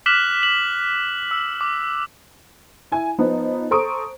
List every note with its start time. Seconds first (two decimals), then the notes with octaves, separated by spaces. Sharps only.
0.06 D6 F6 F#6 B6 E7 F#7
0.43 F#7
1.31 E6
1.61 D6
2.92 E4 G#5
3.18 F3 B3 D#4
3.71 A4 C5 A#5 C#6 D#6 D7